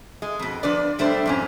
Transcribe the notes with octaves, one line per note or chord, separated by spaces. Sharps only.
G#3
F2 B2
F3 D4 B4 D5
B2 G3 A3 D4 C5
F2 G#2 C#4